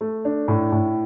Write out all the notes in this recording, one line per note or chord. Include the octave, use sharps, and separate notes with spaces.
A3
D4
A2
A2